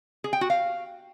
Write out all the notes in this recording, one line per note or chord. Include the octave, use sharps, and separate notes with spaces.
G#4
G5
F#4
F5